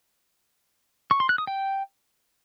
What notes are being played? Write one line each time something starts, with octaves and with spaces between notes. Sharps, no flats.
C#6
C6
F#6
D#6
G5